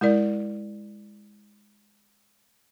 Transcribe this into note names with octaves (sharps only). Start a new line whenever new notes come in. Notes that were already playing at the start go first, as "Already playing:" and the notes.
G#3 E4 A#4 D5